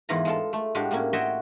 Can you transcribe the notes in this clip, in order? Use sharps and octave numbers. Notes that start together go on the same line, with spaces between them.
E2 G#2 E3 F4 B4 A#5
G#3 F4 A4
A3
A2 G#3 D4 F#4 G4 F5
A2 A#3 C#4
F#4 C5 C#5 D#5 E5 G5